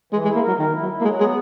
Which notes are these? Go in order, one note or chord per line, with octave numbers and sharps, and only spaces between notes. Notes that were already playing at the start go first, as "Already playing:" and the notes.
E3 G#3
G#3
E4
A#3
F#3 A#4
D#3 A#4
E4
F#3
E4
A#3
F#3 G#3
G#3 B3